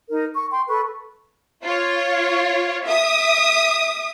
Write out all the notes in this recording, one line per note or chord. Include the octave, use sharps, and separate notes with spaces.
D#4 A#4
C#6
G5 C6
A4 B4 C#6
F4 C#5
E5 D#6